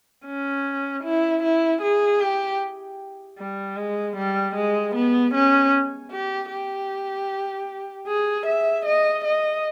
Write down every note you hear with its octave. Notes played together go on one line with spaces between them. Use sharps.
C#4
E4
E4
G#4
G4
G3
G#3
G3
G#3
B3
C#4
G4
G4
G#4
E5
D#5
D#5